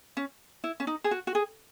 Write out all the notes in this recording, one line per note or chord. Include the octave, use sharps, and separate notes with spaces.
C#4
E4
C#4
D#4
G#4
F#4
F#4
G#4